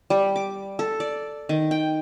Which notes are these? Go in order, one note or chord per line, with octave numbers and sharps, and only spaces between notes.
G3
D6
A4
D5
D#3
G5